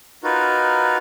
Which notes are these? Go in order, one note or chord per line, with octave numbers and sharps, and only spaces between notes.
D#4 F4 F#4 A#4 B4